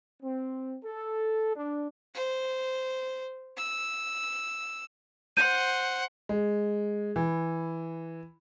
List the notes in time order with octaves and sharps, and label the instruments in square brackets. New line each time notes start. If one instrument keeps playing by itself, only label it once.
[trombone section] C4
A4
D4
[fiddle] C5
E6
[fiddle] C5 F#5 [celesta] G6 D#7
[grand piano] G#3
E3